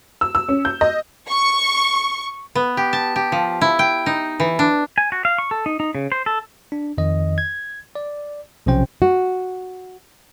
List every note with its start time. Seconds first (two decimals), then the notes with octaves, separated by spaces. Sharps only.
0.21 E6
0.35 E6
0.49 C#4
0.65 G6
0.81 D#5
1.30 C#6
2.55 B3
2.77 G4
2.93 A5
3.16 G4
3.32 F3
3.61 E4
3.79 G5
4.06 D#4
4.40 E3
4.59 D4
4.98 G#5
5.12 F#4
5.25 F5
5.38 C#6
5.51 A4
5.66 D#4
5.80 D#4
5.95 C#3
6.12 C5
6.26 A4
6.72 D4
6.98 F2 D#3 D#5
7.38 G#6
7.95 D5
8.66 B1 C3 F3 C#4 C5 G5
9.02 F#4